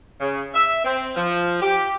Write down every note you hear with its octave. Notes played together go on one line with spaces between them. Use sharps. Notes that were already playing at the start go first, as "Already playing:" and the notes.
C#3
E5
C4
F3
G4